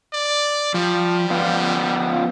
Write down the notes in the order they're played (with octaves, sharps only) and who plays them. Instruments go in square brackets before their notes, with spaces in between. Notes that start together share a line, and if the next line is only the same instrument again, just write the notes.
[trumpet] D5
[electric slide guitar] F3 [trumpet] G3
[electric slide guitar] F3 B3 F4